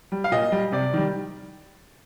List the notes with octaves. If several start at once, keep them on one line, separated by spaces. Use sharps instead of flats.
G3
F5
A#2 D#5
G3
C3 D5
D#3 G3